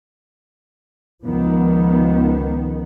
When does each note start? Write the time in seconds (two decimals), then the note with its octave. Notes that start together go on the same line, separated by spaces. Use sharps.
1.24 C#2 D#3 F3 B3